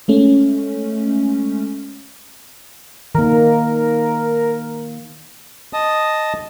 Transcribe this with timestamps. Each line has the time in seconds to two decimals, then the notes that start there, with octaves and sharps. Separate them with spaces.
0.08 G#3 A3 C#4
3.15 D#3 A#3 A#4
5.73 D#5 A5 D#6